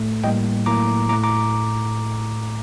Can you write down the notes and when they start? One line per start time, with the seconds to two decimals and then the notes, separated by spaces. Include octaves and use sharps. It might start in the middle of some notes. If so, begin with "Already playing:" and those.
Already playing: A2 A3
0.23 A2 G3 A#3 D#5 G5
0.66 A2 F#3 A#3 A#5 D6
1.09 A2 A#5 D6
1.12 A3
1.23 A#5 D6